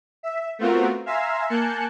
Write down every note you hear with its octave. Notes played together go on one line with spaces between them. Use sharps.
E5
A3 B3 C4 F4 F#4 A#4
E5 F5 G#5 A#5 C6 E6
A#3 G#5 A5 F#6 G6 C#7